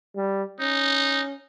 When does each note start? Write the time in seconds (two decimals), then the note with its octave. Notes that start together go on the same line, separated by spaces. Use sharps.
0.16 G3
0.60 C#4 D#4